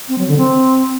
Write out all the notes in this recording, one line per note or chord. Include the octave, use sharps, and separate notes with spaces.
C4
F#3
D3
C4